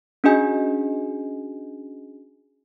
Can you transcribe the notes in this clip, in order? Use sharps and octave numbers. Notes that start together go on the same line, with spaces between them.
C#4 D4 F#4 G#4 D#5 G#5